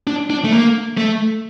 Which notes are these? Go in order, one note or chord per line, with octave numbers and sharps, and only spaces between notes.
D4
D4
A3
A#3
A3